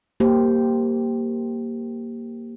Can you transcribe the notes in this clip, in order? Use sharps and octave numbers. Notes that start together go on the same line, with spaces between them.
A#3 G4 C5